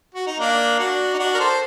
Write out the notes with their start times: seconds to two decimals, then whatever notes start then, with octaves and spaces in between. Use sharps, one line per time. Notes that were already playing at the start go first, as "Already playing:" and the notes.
0.14 F#4
0.27 D#4
0.39 A#3 D4
0.79 D4 F#4
1.13 D#4
1.19 D4 F#4
1.34 A#4
1.39 A4 C5